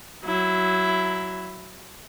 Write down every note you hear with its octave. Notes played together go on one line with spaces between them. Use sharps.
F#3 E4